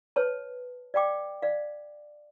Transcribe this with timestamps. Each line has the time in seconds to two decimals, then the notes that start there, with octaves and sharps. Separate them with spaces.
0.16 B4 C#5 A5
0.94 D5 F5 G5 D6
1.42 D5 F5